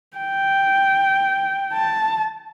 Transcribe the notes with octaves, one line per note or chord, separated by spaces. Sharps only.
G5
A5